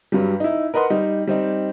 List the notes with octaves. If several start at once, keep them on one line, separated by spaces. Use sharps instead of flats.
G2 F#3 G3
D#4 E4
A#4 B4 D#5 F#5 C6
G3 D#4
G3 C4 D#4